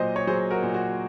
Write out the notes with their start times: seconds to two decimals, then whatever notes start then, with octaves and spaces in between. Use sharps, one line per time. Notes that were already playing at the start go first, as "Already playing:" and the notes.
Already playing: A#2 F#3 C5 D#5
0.16 C#5
0.27 F#3 G#4 C5
0.51 F#4 A#4
0.63 A#2
0.74 F#4